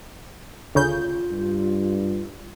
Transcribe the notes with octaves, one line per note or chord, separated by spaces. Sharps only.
D2 C#3 F4 G6
G2